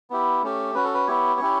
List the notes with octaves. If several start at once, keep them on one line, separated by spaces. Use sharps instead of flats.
B3 E4 G4
A3 C#4 G4
C#4 F#4 B4
A4
B4
B3 E4 G4 C#5
C#4 E4 G4